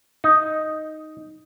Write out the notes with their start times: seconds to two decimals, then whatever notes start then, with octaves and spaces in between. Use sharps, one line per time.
0.24 D#4